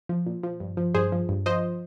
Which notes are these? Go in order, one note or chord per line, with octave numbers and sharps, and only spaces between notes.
F3
A#2
F3
G2
F3
G2 G#4 C5
F3
G2
F3 C5 D#5